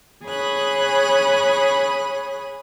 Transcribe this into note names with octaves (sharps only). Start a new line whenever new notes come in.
G#4 C#5 B5 D#6 F#6